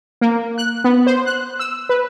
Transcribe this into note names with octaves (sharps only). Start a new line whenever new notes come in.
A#3
F#6
B3
C5
F#6
E6
B4